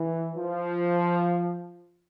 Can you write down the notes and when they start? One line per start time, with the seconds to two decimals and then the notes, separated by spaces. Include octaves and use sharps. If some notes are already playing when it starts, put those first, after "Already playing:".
Already playing: E3
0.35 F3